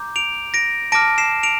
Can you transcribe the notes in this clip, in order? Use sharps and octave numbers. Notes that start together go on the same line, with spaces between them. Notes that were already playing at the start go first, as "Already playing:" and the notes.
Already playing: A#5 D6 G6
D7 F7
A#6 D7
A5 D6 F6 A#6 D7
C7 E7
D7 F7